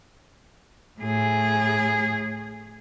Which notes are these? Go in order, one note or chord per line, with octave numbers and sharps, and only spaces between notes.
A2 G#4